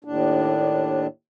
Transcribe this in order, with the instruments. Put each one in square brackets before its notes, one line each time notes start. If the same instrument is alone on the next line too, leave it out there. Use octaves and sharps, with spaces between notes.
[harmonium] D#2 A2 D4